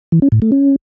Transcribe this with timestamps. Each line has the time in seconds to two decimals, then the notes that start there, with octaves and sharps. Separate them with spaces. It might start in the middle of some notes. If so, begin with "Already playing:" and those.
0.12 E3
0.22 C#4
0.32 A2
0.42 A3
0.52 C#4